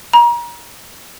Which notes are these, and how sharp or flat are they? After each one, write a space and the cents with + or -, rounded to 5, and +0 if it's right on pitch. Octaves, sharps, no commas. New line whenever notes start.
A#5 +35